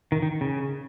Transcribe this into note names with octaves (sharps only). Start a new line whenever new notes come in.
D#3
D#3
C#3